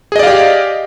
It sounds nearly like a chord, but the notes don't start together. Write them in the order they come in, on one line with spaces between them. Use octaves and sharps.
G#4 D#5 D5 F5 G4